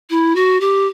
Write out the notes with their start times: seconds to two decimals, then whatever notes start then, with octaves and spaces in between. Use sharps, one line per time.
0.10 E4
0.35 F#4
0.60 G4